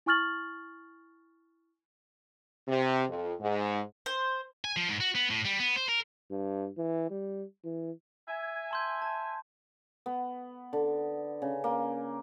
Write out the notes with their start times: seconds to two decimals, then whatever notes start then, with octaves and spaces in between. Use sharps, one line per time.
0.06 E4 G#5 C#6 F6 A6 F#7
2.68 C3
3.09 F2
3.40 G#2
4.06 C5
4.64 G#5
4.77 F3
4.89 G#2
5.00 F#4
5.15 B3
5.30 A2
5.45 G3
5.59 B3
5.76 C5
5.89 A#4
6.31 G2
6.77 E3
7.10 G3
7.65 E3
8.28 E5 G#5
8.71 A5 C6 G6
9.02 A5
10.06 B3
10.73 D3
11.42 C#3
11.64 A#3